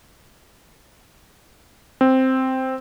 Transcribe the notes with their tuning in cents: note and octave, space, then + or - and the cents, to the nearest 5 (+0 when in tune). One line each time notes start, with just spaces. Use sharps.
C4 +0